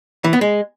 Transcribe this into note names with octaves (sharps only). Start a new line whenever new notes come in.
E3
B3
G#3